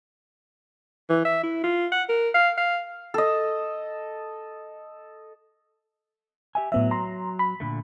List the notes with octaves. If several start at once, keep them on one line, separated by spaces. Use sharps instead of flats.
E3
E5
E4
F4
F#5
A#4
F5
F5
A4 D#5
G4 E5 G#5
A2 F#3 B3 E5
A#5 C6
B5
A#2 D3 A3